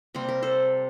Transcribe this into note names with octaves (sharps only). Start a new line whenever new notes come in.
C3 G3 A#3 C5
A#4
A4 C5